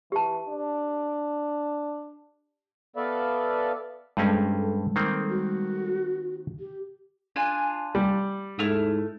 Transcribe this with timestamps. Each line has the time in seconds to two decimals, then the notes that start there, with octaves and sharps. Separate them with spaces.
0.12 E3 G4 A5
0.49 D4
2.96 B3 A4 B4 D5 E5 F5
4.17 G2 G3 G#3 C4 C#4 A4
4.96 D#3 A#3 C4
5.30 F#4
6.60 G4
7.36 D4 F4 G#5
7.95 G3
8.59 G#2 A3 E4 F6